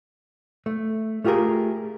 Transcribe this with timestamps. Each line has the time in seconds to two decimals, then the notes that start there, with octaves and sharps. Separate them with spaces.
0.66 A3
1.24 A3 F4 G4 G#4 A#4